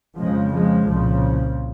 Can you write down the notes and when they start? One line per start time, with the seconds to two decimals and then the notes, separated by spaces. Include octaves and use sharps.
0.18 F2 C#3 F3 G#3
0.52 F3 G#3
0.87 C2 A#2 C#3 F3